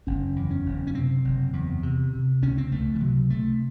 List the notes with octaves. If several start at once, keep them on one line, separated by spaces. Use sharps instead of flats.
F#1 C#4
E2
C#4
F#1
C#4
C3 C4
F#1
E2
C3
C3
C#2 C#4
C4
C#2 A3
E3
C3 F#3
C3 A3